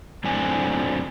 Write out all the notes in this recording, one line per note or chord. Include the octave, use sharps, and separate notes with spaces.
F#2 A2 D3 C4 D4 G#5